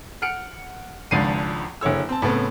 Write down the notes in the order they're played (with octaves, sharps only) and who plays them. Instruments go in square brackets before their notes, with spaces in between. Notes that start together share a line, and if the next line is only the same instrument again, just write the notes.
[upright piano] F#5 F6 C#7 D7
G#1 C#2 F3 D4 C7 D#7
F#1 D3 E4 C#5 E6
C4 A5
A2 C#3 B3 C4